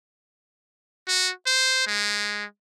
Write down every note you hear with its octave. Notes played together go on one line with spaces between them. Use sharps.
F#4
C5
G#3